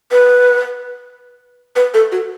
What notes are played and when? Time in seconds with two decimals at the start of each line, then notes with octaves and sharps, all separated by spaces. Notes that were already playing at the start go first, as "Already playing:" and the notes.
0.12 B4
1.76 B4
1.94 A4
2.12 F#4